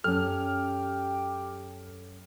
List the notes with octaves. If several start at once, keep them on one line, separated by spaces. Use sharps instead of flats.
F#2 C#4 G4 A4 F6